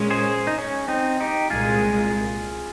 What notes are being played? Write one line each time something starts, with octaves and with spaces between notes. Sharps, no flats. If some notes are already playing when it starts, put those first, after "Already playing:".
Already playing: A#2 G#3 C#4
G#4 C5
D#4
C#4
C4 D#4
D#4 G4
C2 A#2 G#3 F4 G#4